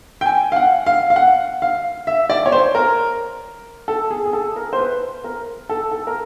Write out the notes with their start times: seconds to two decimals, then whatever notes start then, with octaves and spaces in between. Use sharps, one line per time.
0.21 G5
0.26 G#5
0.52 F5
0.56 F#5
0.86 F5
1.10 F5
1.16 F#5
1.62 F5
2.07 E5
2.30 D5
2.46 C#5
2.52 C5
2.75 A#4
3.88 A4
4.11 G#4
4.26 G#4
4.33 A4
4.56 A#4
4.73 C5
4.78 B4
5.24 A#4
5.69 A4
5.91 A4
6.07 A#4